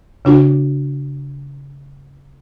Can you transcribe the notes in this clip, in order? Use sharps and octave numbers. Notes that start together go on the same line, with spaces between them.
C#3 D4 F#4